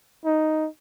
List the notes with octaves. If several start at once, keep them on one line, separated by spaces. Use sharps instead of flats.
D#4